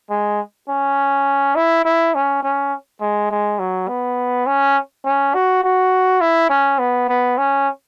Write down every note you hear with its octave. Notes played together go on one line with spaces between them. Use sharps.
G#3
C#4
E4
E4
C#4
C#4
G#3
G#3
F#3
B3
C#4
C#4
F#4
F#4
E4
C#4
B3
B3
C#4